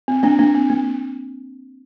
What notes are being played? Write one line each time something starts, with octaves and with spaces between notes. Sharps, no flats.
C4
A#3 D4
A#3 D4
C4
A#3